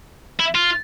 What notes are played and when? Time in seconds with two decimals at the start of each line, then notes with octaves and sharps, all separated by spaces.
0.40 E4
0.55 F4